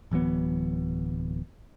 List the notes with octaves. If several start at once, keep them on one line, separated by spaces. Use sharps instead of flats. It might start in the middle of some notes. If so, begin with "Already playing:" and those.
D1 E3 F#3 B3